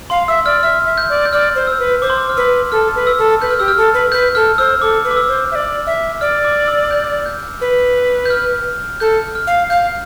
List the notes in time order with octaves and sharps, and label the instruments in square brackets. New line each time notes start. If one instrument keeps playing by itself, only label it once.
[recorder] F5 [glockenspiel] C6
[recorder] E5 [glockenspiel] E6
[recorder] D5 [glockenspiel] F6
[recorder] E5 [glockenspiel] F6
[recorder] E5
[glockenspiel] G6
[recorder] D5
[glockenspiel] G6
[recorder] D5 [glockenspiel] F6
[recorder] C5
[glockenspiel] E6
[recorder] B4
[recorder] C5 [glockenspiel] D6
[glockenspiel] C6
D6
F6
[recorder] B4 [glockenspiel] E6
[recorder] A4 [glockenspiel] F6
[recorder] B4
[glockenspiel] E6
[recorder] A4
[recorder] B4 [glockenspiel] G6
[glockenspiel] F6
[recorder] G4 [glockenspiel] E6
[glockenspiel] F6
[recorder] A4
B4
[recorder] B4 [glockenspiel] G6
[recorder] A4 [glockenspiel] F6
[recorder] C5 [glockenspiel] E6
[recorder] A4 [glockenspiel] D6
[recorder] B4
[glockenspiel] D6
E6
[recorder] C5
E5
D5
E5
[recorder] D5 [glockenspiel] F6
[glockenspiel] D6
E6
G6
G6
[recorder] B4
[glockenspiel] G6
F6
[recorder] A4 [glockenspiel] G6
[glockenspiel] F6
[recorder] F5
[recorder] F5 [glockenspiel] G6